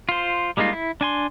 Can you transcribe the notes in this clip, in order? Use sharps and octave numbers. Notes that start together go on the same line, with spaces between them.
F4 C5
G3 G#3 A#3 D#4 F4
E4
D4 G#5 C6